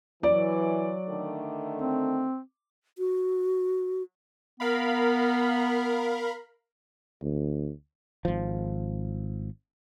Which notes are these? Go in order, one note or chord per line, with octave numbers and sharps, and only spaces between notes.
E3 F#3 D5
D3 D#3 A3
C4
F#4
B3 A#4 F5 B5
D2
G#1 F3